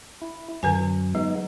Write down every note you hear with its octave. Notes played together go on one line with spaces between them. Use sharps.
E4
F#2 D3 F#3 B4 G#5
F#3 G#3 B3 D#4